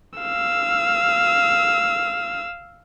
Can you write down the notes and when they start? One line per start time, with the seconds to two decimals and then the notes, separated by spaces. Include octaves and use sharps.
0.19 F5 E6